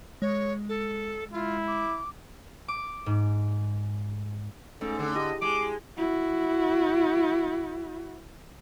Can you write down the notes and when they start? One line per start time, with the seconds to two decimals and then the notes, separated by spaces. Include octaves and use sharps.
0.22 G#3 C#5
0.69 A4
1.33 E4 F4
1.67 D6
2.68 D6
3.06 G#2
4.81 G#2 A3 C#4 D#4 A4
4.99 D3
5.16 E4 G4 G#4 D#5
5.42 G#3 D6
5.97 E4 F#4